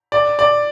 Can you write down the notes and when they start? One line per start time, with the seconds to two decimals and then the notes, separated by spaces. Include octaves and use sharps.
0.12 D5
0.39 D5